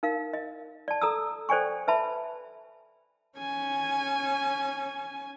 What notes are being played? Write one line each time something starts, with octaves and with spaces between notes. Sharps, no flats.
D#4 A#4 F5
D#5
D5 A5
A4 A#5 D#6 E6
A4 C5 D5 G5 G#5 C#6
B4 E5 A5 B5
C#4 G#5